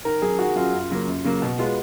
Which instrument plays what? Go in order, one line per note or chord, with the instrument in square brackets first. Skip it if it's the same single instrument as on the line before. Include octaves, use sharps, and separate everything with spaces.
[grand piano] D#3 [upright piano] A#4
[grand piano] F#3 C#4 [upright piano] G#4
[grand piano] D#3 [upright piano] F#4
[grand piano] F#3 C#4 [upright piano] F4
[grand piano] F#2
C#3 F#3 A#3
F#2
C#3 F#3 A#3
[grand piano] B2 [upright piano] F#4
[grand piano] G#3 B3 F4